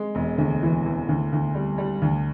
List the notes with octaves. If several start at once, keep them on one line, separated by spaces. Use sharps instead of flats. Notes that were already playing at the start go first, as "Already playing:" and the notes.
Already playing: G#3
E1
D2
E3
E3
D2
D2
G3
G3
D2